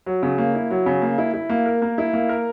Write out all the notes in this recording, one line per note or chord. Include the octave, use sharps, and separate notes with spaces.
F#3
C#3
A#3
E4
F#3
C#3
A#3
E4
E4
A#3
A#4
A#3
E4
A#3
A#4